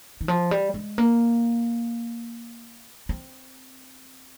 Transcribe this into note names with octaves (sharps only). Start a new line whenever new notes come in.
D#3
F3
G3
G#3
A#3
C4